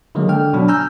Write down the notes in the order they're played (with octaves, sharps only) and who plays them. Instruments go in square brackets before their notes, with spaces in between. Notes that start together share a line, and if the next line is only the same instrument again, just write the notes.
[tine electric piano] D3 D#3 F#3 G#3 A#3
D3 G5 F6
B2 F#3 D4
G#5 A#5 E6 F6 G6